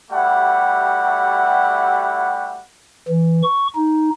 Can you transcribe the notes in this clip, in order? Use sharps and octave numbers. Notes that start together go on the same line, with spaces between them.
G3 A3 E4 F#4 G4 F#5
E3
C#6
D#4